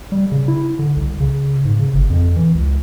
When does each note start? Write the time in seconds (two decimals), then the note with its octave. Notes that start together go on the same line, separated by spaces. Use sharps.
0.12 G3
0.32 C#3
0.48 E4
0.79 D3
0.97 C2
1.20 C#3
1.65 G#2
1.79 C#3
1.94 G1
2.10 F2
2.36 E3
2.55 C#2